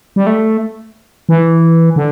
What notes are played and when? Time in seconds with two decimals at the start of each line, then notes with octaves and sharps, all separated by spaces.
0.16 G3
0.27 A3
1.29 E3
1.96 D3